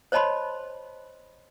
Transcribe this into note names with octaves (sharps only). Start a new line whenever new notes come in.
C5 C#5 D#5 A5 B5 C6